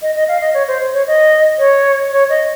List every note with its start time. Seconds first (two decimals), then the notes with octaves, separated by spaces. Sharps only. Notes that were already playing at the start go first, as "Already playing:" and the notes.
0.02 D#5
0.15 D#5
0.28 F5
0.41 D#5
0.54 C#5
0.68 C5
0.93 C#5
1.07 D#5
1.59 C#5
2.12 C#5
2.30 D#5